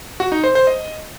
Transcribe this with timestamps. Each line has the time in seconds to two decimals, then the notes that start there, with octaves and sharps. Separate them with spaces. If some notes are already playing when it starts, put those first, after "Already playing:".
0.20 F#4
0.32 D#4
0.44 C5
0.55 C5
0.67 D#5